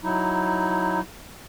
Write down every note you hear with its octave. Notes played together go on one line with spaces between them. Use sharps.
F#3 D#4 E4